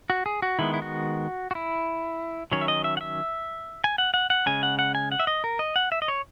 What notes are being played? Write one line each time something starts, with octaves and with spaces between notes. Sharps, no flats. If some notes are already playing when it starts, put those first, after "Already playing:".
F#4
G#4
F#4
D#3 G#3 B3 E4
E4
F#4
F#4
E4
D#3 F#3 C#4 C#5
E5
D#5
E5
F#5
E5
G#5
F#5
F#5
F#5
C#3 G#3 C#4 G#5
F#5
F#5
G#5
F#5
E5
D#5
A#4
D#5
F#5
E5
D#5
C#5